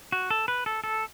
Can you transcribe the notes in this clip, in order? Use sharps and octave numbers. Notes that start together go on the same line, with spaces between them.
F#4
A4
B4
A4
A4